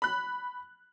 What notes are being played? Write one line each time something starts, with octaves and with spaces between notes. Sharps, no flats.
B5 F#6